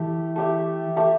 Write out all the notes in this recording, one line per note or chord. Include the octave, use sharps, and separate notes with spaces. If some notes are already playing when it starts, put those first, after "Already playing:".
Already playing: E3 A3 G4 E5
A3 G4 E5
A3 G4 E5